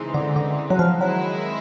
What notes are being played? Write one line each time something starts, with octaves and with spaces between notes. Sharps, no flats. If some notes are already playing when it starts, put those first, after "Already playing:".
Already playing: C#3 E3 G#3 C4 D#4
D3
D3
F#3
F3
D#3 F#3 G#3 C4 E4